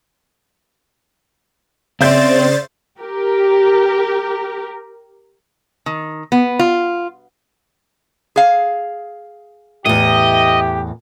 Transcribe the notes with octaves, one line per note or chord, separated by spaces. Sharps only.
C#3 C4 C5 D5 E5 G6 A6
G4 A#4
D#3
B3
F4
G#4 F5
E2 A2 G4 D#5